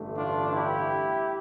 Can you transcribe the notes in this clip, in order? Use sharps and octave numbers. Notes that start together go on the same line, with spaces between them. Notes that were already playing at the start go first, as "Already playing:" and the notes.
Already playing: A1 G2 D3 A3
D4 F4
E4 G4